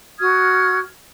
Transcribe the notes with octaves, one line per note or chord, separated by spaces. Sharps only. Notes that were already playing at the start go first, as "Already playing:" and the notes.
F#4 D#6 F6 G#6